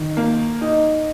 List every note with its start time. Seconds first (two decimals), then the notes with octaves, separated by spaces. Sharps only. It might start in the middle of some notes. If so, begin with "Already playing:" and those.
Already playing: D#3
0.17 A#3
0.61 D#4